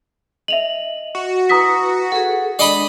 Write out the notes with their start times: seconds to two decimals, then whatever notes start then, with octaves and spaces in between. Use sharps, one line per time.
0.48 D#5 E5 F7 F#7
1.15 F#4
1.49 E4 B4 A#5 D#6 B6
2.12 G#4 A4 F#5
2.59 G#3 D4 D5 D#5 B5